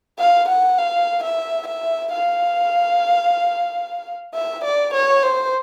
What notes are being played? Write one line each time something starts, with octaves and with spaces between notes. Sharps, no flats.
F5
F#5
F5
E5
E5
F5
E5
D5
C#5
C5